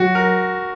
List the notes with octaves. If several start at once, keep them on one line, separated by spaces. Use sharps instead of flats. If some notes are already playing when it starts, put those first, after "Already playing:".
Already playing: F#3 F#4
A#4